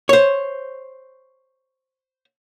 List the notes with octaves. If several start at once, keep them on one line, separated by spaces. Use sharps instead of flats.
C5 C#5